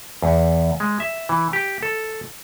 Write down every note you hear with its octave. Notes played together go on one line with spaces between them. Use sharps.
E2
G#3
E5
E3
G4
A4